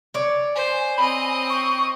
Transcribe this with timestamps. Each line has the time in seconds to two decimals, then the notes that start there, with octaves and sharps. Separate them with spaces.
0.14 C#5 D5
0.55 C5 G#5
0.98 C4 D#5 B5
1.50 C#6